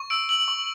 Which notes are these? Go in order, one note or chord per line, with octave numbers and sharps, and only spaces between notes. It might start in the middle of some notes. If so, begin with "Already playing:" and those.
Already playing: C#6
E6 D7
E6 F#7
C#6